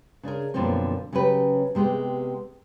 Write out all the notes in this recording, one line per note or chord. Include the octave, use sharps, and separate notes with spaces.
C#3 D4 G#4 A#4
F#2 B2 D3 F3 A#3 C4
C#3 F#3 C#4 G4 B4
C3 G#3 B3 G4